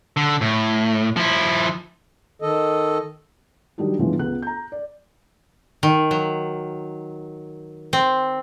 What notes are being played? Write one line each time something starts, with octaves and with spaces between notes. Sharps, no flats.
D3
A2
F3 E4
D#3 A4 D#5
D#3 F#3 G3 D4 D#4 G4
G2 C#3 E3 F3 G#3 B3
C#2 B3 F#6
A#5 G6
D5
D#3
F#3
C4